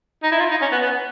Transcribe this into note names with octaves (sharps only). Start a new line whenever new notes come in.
D#4
E4
F4
D#4
C#4
B3
B3